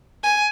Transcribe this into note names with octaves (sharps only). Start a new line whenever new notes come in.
G#5